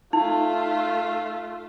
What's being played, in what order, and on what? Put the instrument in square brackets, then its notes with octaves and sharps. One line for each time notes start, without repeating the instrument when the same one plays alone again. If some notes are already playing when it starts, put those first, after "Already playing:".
[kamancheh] A3 F4 [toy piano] D#4